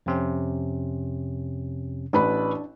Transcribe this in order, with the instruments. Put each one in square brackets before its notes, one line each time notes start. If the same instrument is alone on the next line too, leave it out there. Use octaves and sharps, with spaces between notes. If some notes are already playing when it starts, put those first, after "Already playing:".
[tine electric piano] F2 C3 C#4
[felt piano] A1 B4 B5 [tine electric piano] D4